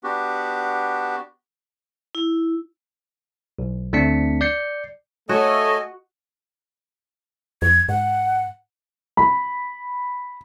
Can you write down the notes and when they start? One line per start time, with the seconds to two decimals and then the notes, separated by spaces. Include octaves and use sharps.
0.04 B3 D4 F#4 G4
2.15 E4
3.59 B1
3.93 D2 A3 C4 D4 B6 C#7
4.41 D5 G6 C7 C#7
5.29 A3 F#4 A4 C#5 D#5 G#5
7.62 F2 G#6
7.89 G#2 F#5
9.17 B5